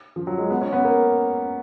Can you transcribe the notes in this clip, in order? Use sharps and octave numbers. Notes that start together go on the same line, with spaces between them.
F3
F#3
G#3
B3
C#4
B3
A#3